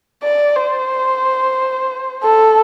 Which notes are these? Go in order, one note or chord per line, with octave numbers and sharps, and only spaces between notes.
D5
C5
A4